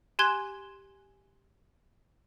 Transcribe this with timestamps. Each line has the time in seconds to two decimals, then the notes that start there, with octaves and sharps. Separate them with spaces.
0.19 G4 G#5 C6 F#6 G#6 G7